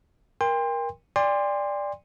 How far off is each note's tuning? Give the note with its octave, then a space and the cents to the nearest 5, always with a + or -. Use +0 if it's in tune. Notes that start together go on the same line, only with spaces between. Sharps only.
A#4 +20 G5 +35 C6 +0
D5 +0 G5 +45 C6 +0